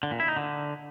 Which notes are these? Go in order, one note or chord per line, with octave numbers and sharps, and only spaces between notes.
D3
A#2
E4
D#4
D3